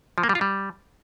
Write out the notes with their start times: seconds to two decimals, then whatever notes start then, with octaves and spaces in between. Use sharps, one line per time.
0.18 F3
0.23 A#3
0.29 G3
0.35 F4
0.41 G3